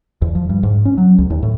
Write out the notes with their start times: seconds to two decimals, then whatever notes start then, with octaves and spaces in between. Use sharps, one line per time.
0.22 E2
0.35 F3
0.49 G2
0.63 G#2
0.85 C#4
0.98 F#3
1.18 C#2
1.30 D#2
1.43 A2